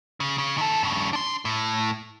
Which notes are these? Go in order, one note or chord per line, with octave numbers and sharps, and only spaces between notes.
C#3
C#3
D#3 A4
G2 C#3
D4 C6
A2